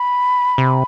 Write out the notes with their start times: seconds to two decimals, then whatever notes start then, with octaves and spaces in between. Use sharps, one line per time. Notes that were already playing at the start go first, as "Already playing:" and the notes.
Already playing: B5
0.58 C3